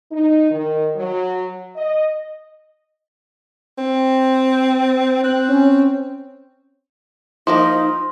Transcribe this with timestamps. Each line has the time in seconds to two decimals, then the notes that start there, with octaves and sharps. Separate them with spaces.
0.12 D#4
0.51 D#3
0.95 F#3
1.76 D#5
3.78 C4
5.23 C4 F#6
5.49 C#4
7.47 F3 A#3 D#4 A#4 C6